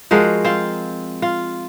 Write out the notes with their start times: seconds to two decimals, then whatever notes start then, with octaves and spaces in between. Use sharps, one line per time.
0.11 F3 G#3 F#4 A#4
0.45 C4 F4
1.22 F4